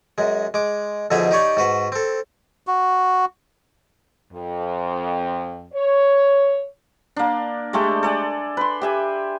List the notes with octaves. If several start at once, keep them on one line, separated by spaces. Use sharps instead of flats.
F#2 G#3
G#3 D6
F2 B2 D3 D#4 G#4 E5
D#4 G4 C#5 D5
G#2 F#4 B4
C4 A4
F#4
F2
C#5
A#3 D4
G#3 A3 G4 A4
A4 D5 G#5
B4 C6
G4 E5 G#5